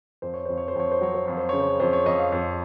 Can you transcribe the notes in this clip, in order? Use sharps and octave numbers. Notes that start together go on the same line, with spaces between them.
F2 C5
C#5
F2 C5
C#5
C5
F2 C#5
C5
F#3 C#5
C5
F2 C#5
C5
C#3 C#5
C5
F2 C5
C#5
F2 D#5
F5
F2